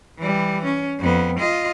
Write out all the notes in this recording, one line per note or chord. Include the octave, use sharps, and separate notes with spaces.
E3 G3
C#4
F2 B3
F4 D#5